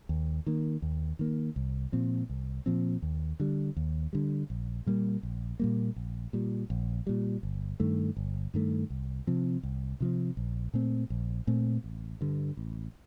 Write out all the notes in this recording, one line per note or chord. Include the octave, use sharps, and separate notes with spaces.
D#2
D#3 A#3
D#2
D#3 A#3
C2
A#2 F3 C4
C2
A#2 F3 C4
D#2
D3 G3
D#2
D3 G3
A#1
A#2 G3 A#3
A#1
A#2 G3 A#3
A#1
A#2 G3
A#1
A#2 G3
G1
G2 D#3 A3
G1
G2 D#3 A3
C2
C3 F3 C4
C2
C3 F3 C4
A#1
A#2 A3 C4
A#1
A#2 A3 C4
A1
G2 D3
A1